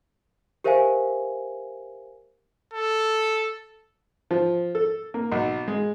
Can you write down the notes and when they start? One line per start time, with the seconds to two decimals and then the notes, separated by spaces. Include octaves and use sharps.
0.64 G4 A#4 C5 E5 F5 G#5
2.74 A4
4.31 F3
4.75 A4
5.14 A#3
5.32 B1
5.68 G#3